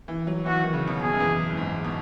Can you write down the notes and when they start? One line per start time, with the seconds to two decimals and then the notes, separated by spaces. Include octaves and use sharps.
0.08 E3
0.27 F#3
0.46 E3 F#4
0.60 D#3
0.73 C#3
0.88 B2
1.01 B2 G#4
1.13 F#2
1.20 E2
1.50 F#2
1.57 G#2
1.84 B2